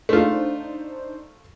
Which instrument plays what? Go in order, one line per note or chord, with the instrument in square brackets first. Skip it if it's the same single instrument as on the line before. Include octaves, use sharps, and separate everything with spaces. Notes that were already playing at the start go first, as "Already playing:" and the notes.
[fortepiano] A3 F4 [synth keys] D4 D#4 C5